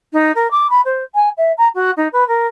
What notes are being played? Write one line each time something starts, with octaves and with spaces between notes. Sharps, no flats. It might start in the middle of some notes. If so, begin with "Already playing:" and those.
D#4
A#4
D6
B5
C5
G#5
E5
A#5
F#4
D#4
B4
A#4